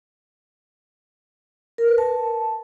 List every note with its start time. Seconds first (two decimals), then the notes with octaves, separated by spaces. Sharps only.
1.78 A#4
1.88 B4
1.98 A5